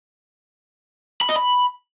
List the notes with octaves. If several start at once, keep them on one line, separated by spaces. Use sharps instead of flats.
B5
D#5
B5